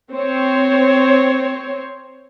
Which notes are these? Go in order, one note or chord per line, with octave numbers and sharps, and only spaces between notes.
C4 C5 C#5